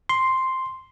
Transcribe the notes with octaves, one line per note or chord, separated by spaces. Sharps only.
C6